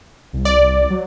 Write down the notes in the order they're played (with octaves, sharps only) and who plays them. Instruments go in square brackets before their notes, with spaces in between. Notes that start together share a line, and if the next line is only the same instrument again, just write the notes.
[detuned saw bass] C2
[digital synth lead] D5
[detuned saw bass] F#3